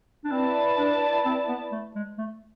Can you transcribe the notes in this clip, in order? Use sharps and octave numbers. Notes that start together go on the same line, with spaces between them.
D4
C4 E4 B4 D5 A5
D4
C4
B3
A3
G#3
A3